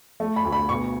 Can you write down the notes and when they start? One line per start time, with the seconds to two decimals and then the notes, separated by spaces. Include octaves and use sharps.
0.20 A3
0.36 B5
0.45 D2
0.52 B5
0.69 B2 C#6